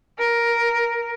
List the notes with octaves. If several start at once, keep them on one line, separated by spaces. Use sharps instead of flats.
A#4